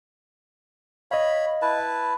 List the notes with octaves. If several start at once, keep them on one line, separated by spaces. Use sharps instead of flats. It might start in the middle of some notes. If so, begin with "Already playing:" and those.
C#5 D#5 F5 B5
E4 B4 A5